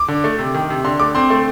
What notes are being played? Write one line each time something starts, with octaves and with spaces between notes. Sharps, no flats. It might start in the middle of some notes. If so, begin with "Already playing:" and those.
Already playing: D6
D3
A3
C3
D#3
C3
D3 C6
A3 D6
C4 C6
A3